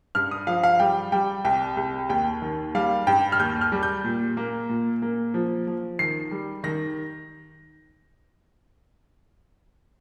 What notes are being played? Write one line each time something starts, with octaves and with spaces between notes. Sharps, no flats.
G2 F6
D#6
F3 F5
F5
G3 G5
G3 G5
C2 G5
C2
D#2 G5
D#3
G3 F5
G2 G5
F6
D#2 G6
F6
G3
G6
A#2
A#3
A#2
A#3
F3
F3
D#3 C7
G3
D#3 A#6